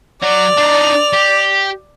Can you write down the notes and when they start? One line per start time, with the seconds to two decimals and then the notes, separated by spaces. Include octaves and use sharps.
0.22 F#3 F#4 D5 F7
0.57 D4 D#4
1.13 G4